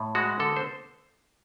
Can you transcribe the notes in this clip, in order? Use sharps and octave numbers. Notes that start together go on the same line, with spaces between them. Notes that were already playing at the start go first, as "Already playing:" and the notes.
Already playing: A2
G#3 F#4
D3 A4
C5